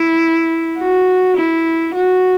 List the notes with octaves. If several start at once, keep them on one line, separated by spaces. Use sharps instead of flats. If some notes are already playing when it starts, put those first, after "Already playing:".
Already playing: E4
F#4
E4
F#4